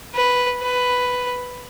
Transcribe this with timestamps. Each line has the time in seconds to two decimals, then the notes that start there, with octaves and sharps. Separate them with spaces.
0.14 B4
0.62 B4